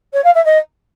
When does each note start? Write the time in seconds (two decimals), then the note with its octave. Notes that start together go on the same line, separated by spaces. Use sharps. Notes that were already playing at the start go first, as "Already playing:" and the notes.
0.13 C#5
0.24 F5
0.34 E5
0.45 D#5